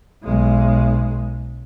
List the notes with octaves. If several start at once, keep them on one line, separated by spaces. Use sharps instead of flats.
B1 G#3